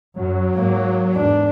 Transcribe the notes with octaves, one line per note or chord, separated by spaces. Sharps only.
F#2 F#3
G#2 A#3
E2 G#2 D4